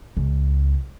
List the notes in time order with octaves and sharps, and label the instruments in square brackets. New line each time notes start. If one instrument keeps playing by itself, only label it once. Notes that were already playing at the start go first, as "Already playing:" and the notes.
[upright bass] C#2